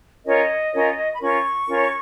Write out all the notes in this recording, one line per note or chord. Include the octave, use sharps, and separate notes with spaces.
C#4 F4 A#4 C#5 D#5
C#4 F4 A#4 C#5
B5
C#4 F4 A#4 C#5 C#6
C#4 F4 A#4 C#5